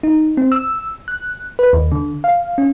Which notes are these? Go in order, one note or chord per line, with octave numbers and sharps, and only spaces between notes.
D#4
C4
E6
F#6
B4
D#2
D3
F5
C#4